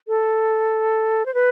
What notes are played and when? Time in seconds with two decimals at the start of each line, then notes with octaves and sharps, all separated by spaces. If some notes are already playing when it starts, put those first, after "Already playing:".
0.08 A4
1.26 C5
1.34 B4